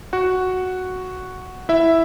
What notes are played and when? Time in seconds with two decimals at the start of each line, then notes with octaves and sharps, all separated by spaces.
0.13 F#4 F#5
1.69 E4 E5